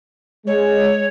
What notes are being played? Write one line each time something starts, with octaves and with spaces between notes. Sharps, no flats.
G#3 C#5